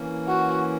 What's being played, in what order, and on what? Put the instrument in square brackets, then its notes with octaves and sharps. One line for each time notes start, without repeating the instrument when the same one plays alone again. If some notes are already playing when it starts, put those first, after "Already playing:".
Already playing: [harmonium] E3 A#3 C#4
[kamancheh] F#4